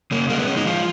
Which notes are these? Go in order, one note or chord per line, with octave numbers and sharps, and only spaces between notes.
C#3 A#3
G#3 A#3
B3
G#3 C#4
D#4
F3 F4